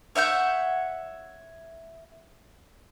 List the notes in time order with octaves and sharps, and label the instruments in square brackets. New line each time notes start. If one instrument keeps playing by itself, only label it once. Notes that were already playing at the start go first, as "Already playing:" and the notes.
[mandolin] C#5 E5 F#5 G6